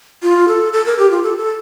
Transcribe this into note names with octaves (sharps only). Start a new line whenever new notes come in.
F4
A4
A4
A#4
G4
F4
A4
A4